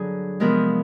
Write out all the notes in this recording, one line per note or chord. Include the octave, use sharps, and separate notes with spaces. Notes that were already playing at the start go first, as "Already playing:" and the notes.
Already playing: G2 D3 F#3 G#4
C3 F3 G#3 B3 A#4